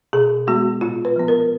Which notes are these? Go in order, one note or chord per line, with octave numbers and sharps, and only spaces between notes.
B2 G#4
G#3 B3 F#4
A#2 F4
B4
F3 B3
A#4